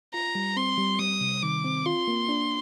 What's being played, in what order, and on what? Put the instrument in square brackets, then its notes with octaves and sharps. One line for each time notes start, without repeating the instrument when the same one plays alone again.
[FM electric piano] F4 [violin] A#5
[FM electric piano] G3
[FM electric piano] C4 [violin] C6
[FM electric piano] G3
[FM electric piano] G3 [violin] D#6
[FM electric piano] C3
[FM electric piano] D#3 [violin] D6
[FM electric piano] C4
[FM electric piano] F4 [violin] C6
[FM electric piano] A#3
D4